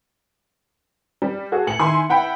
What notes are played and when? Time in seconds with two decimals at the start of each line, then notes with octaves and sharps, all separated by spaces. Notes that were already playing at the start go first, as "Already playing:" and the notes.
1.22 G3
1.52 F#4 G#4 A4
1.67 A2 G#5 C#7 F#7
1.79 D#3 E4 G#5 C6
2.09 E4 F#5 G5 B5